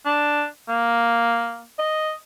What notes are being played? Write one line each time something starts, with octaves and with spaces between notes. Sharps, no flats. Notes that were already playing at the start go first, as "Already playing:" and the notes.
D4
A#3
D#5